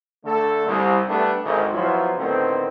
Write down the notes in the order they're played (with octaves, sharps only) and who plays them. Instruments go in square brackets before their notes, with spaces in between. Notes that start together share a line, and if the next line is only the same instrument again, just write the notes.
[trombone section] D3 A3 A4
C2
G3 A3 B3 D4 A4 B4
G#1 D2
F3 F#3 B3 E4 F4
A2 D3 D#3 B3 C4